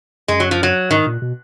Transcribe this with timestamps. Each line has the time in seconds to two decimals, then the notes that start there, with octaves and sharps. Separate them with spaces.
0.28 F#2 G#3
0.40 F#3
0.51 F3
0.63 F#3
0.90 G#2 D#3
1.06 A#2
1.22 B2